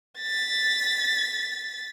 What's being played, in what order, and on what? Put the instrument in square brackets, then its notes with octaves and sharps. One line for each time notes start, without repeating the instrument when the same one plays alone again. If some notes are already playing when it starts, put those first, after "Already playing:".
[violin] A6 B6